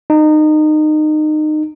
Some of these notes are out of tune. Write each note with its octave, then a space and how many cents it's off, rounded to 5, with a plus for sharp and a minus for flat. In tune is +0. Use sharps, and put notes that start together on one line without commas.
D#4 -25